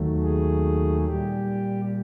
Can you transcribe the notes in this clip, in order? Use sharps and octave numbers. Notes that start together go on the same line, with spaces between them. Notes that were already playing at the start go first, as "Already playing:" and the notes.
Already playing: D#2 D#3 F#3 A3
G#4
A#2 G3 G4